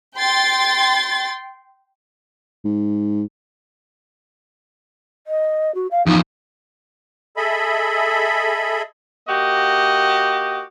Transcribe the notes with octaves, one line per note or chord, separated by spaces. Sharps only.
G5 C6 A6
G#2
D#5
F#4
F5
E2 F3 D#4
G#4 A4 D#5 E5 B5
A#3 F#4 G4 D#5